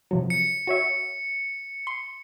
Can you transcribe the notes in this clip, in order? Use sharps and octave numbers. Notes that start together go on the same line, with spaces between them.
C3 F3 F#3
C#7
F#4 C#5 E5
C6